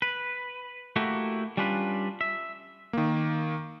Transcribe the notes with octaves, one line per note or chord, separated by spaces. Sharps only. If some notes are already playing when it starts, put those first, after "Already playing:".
B4
A3 A#3 E4 F#4 G4
G3 C#4 D4 F4 B4
E5
D#3 A#3